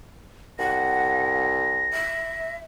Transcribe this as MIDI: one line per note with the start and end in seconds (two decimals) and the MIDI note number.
0.59 2.05 36
0.59 1.47 78
0.59 2.53 94
1.92 2.56 76